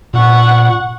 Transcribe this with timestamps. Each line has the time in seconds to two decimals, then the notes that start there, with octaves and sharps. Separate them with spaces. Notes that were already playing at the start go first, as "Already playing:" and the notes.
0.14 A#2 F#5 C#6